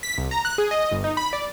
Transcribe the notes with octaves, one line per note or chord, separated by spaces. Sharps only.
B6
C2
A#5
F#6
G#4
D#5
G1
D#4
B5
D5